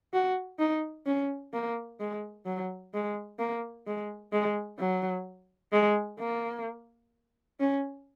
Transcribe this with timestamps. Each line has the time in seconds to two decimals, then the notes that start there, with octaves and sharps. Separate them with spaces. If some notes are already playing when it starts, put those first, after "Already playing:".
0.13 F#4
0.59 D#4
1.06 C#4
1.53 A#3
2.00 G#3
2.46 F#3
2.93 G#3
3.39 A#3
3.86 G#3
4.32 G#3
4.79 F#3
5.72 G#3
6.20 A#3
7.60 C#4